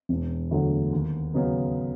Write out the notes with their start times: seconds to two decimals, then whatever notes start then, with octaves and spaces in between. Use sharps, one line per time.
0.09 E1
0.51 D2 D3 F#3 A3
0.92 D#2
1.34 C#3 F#3 B3 D#4